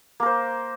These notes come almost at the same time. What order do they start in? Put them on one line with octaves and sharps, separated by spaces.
A#3 A#4 C5